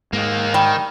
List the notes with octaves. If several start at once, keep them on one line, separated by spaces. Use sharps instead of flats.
G#2 D#3 A#3
D#3 G3 G5